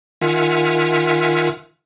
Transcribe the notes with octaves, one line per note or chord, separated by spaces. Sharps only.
D#3 F4 E5 F#5 G#5 F6